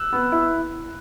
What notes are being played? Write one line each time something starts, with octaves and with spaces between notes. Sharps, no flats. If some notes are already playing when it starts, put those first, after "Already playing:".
Already playing: E6 F#6
B3
E4